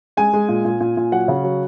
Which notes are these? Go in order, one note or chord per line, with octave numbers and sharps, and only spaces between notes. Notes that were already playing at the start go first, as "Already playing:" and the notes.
G#3 G#5
G#3
A#2
A#2
A#2
A#2
F#3 F#5
C#3
F#3